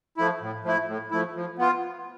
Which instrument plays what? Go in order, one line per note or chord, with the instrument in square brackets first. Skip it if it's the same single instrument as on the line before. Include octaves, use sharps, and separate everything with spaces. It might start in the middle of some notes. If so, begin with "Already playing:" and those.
[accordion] F3 A3 E4
A2
F3 A3 E4
A2
F3 A3 E4
F3
B3 F4